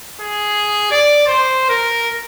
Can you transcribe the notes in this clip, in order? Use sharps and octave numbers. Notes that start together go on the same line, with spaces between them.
G#4
D5
C5
A#4